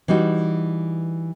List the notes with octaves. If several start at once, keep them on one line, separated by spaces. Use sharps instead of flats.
E3 G3 D#4 F#4